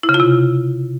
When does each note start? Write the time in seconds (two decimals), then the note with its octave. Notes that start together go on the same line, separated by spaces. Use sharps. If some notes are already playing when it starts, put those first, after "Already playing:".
0.03 E4
0.09 C#3
0.14 F4
0.20 C3